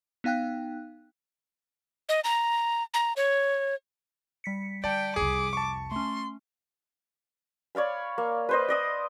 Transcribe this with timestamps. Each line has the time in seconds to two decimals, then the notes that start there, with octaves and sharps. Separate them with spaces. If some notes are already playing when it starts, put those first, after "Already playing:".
0.24 B3 D#4 F5 G5 F#6
2.09 D#5
2.24 A#5
2.94 A#5
3.17 C#5
4.44 G3 B6 C#7
4.84 D3 D5 G5 A5
5.16 C2 F2 G#4 D6
5.53 A5 C#6
5.92 A3 C#4 C6
7.75 C#5 D5 F5 B5
8.18 A#3
8.49 B4 C5 D#5
8.68 D5 D#5 D#6